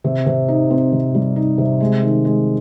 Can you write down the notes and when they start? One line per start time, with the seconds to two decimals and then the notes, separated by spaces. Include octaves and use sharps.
0.04 C3
0.26 C3
0.48 D#4
0.70 C4
0.92 C3
1.14 G3
1.36 D#4
1.58 C3
1.80 G#3
2.02 D#3
2.25 G#3